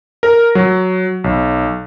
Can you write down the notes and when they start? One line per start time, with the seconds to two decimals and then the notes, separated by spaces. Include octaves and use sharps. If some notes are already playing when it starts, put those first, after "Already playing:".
0.23 A#4
0.55 F#3
1.24 B1